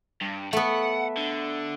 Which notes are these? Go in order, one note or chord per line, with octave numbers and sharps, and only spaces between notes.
G2
A3 B3 F#5
D3